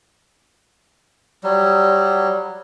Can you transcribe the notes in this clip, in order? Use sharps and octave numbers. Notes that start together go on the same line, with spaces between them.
F#3 G3